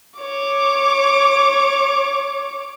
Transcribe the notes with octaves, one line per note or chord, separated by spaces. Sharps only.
C#5 D6